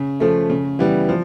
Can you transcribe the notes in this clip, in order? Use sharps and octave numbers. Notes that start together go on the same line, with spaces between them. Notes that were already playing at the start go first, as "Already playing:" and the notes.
Already playing: C#3
F3 A3
C#3
E3 G3 B3
F3